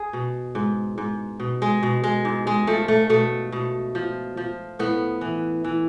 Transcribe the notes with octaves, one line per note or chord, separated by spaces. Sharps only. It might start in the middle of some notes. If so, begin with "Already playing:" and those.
Already playing: G#4
B2
G#2
G#2
B2
G#3
B2
G#3
G#2
G#3
F3 A3
A3
B2 A3
B2
F3
F3
A2 B3
E3
E3